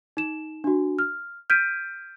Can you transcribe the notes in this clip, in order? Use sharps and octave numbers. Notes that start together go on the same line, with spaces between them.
D#4 E7
D4 F#4
F6
F6 G6 G#6 B6 D7 D#7